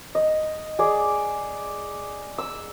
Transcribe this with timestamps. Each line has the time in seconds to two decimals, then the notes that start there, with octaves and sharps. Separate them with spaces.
0.15 D#5
0.79 G#4 D5
2.38 E6